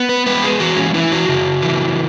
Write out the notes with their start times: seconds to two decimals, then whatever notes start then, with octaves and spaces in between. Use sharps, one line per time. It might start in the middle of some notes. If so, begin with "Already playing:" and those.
Already playing: B3
0.09 B4
0.26 G#3 B4
0.43 G#4
0.60 E3 F#4
0.77 C#4
0.94 E3 E4
1.12 F#4
1.29 C#3
1.62 E3